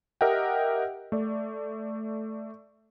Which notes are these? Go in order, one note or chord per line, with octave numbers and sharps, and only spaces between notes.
G4 A#4 D#5 E5 F#5 G5
A3 D5